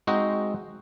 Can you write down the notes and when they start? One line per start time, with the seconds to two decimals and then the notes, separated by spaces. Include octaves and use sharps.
0.07 G#3 C4 D#4 F#4 C5 D#5